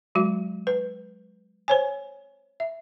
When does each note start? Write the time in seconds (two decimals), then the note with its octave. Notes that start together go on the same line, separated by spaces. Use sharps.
0.15 F#3 G#3 F#4
0.67 B4
1.68 C5 C#5 G#5
2.60 E5